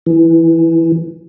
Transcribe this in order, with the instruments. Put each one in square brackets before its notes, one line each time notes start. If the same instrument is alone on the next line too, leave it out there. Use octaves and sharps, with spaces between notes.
[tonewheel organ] E3